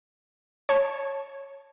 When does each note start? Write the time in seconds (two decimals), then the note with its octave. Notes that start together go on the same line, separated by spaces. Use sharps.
0.69 C#5 A5